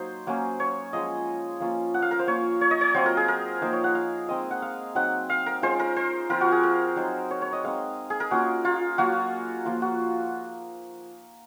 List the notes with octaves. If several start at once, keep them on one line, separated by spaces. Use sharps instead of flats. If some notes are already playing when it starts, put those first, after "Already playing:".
Already playing: F#3 A#3 D#4 C5
F#3 A#3 C#4
C#5
F3 G#3 C#4 D#5
F3 A#3 C#4 F4
F#5
F5
A#4
C5
A#3 F4 C#5
C#5
D#5
C#5
F#3 C4 F4 C5
A#4
G#4
A#4
F3 A#3 D#4 C5
C#5
F#5
F5
G#3 C4 D#4 D#5
F#5
F5
F#3 C4 D#4 F#5
F5
A#4
G#3 C#4 F4 C5
A#4
C5
F3 C4 F4 A#4
F#4
G#4
A#4
F#3 C4 D#4 C5
C#5
C#5
D#5
G#3 C4 D#4 F5
G#4
A#4
A#3 C#4 F4 F#4
F4
F#3 A#3 F4 F#4
F3 A#3 F4
F#4